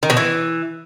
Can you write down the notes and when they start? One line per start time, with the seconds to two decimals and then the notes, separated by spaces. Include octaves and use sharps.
0.03 D#3
0.10 B2
0.17 E3